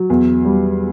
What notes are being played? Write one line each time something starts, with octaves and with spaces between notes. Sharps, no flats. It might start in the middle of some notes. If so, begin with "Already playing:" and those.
Already playing: F#3
E2
G3